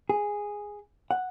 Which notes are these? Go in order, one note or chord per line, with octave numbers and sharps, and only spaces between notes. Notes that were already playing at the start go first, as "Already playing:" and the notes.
G#4
F#5